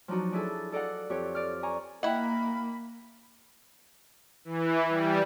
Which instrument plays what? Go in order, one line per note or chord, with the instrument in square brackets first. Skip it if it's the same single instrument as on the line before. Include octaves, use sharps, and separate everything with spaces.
[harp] F3 F#3 D4 D#4 F#4
D4 E4 G#4 A4
A4 D5 D#5 F5 F#5
F2 G4 C#5
D5 F6
G#5 A#5 C#6
[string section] A#3 [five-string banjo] E4 F#5 [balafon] D#5 G5 [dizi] B5
[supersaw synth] E3
G3